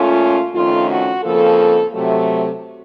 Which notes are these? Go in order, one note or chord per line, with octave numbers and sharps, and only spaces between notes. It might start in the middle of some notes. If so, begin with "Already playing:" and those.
Already playing: A#2 A3 C#4 F4
F2 D#3 A3 C#4 F4
F#4
F2 C#3 F3 A#3 A4
C3 F#3 A3